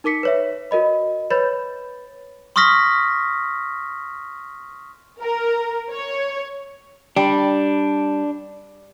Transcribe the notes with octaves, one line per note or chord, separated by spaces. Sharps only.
D#4 A#4 D6 B6 C#7
B4 C#5 E5
F#4 A#4 D#5 B5
B4 C#5 B5 G6 A6
C6 C#6 D#6 F6 A#6 B6
A#4
C#5
G3 D4